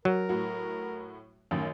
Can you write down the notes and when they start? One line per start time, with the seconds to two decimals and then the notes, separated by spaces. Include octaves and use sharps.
0.05 F#3 A#4
0.29 A2 F#4
1.51 A1 F#2 D#3